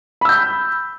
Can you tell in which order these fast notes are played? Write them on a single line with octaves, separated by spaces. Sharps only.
B5 E6 G6